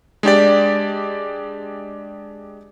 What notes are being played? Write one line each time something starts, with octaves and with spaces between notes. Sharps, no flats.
G#3 D4 G4 D5